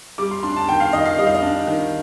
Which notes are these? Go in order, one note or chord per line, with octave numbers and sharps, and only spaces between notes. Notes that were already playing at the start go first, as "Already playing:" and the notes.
G3 D6
C6
D4 C6
A5
D#3 G5
F5
D#3 D#5
F5
G3 D#5
F5
D#5
D4
D#3